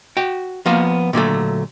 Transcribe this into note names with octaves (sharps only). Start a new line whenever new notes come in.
F#4 G5
F3 A#3 B3 F5
A#2 D3 F#3 A3